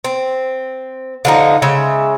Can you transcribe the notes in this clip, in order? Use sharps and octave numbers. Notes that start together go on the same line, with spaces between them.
C4
D3 F3 D#4
C#3 G#3 E5